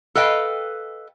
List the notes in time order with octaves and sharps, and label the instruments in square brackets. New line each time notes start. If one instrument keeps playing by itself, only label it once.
[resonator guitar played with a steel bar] A4 B4 D#5 F5 G5